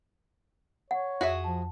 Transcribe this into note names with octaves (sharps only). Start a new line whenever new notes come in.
C#5 F#5
F2 F#4 G#4 E5
F3 A5